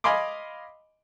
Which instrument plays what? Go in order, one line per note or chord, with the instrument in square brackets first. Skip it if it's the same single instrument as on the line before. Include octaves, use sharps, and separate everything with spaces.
[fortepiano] D#5 F5 G#5 B5 C6 D6